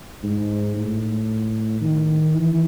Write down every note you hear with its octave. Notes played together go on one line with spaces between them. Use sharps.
G#2
A2
D#3
E3